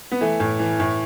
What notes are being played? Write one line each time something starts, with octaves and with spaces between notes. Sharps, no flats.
B3
E3 A3
A2
E3
A2